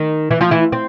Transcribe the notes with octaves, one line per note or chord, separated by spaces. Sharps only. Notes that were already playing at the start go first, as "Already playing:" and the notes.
Already playing: D#3 D#4
E3 E4
F3 F4
E3 E4
C4